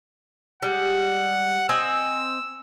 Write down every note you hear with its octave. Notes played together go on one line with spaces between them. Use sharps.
G3 G#3 F#5
C4 D#5 G#5 E6